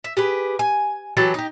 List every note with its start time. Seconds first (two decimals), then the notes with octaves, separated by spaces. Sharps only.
0.04 E5
0.17 G4 G#4 B4
0.59 G#5
1.17 E3 F#3 G4 A4
1.34 D#4 G4